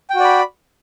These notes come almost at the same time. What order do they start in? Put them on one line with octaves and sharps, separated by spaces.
G5 F#4 D5 B5